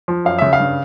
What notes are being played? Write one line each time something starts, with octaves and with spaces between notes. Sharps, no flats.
F3
F#2 F5
C#3 E5
F5
G2